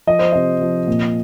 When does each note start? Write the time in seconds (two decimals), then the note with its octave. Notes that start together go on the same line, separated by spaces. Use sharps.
0.07 F3 D#5
0.19 C5
0.33 C3 D#5
0.61 F3
0.87 A#2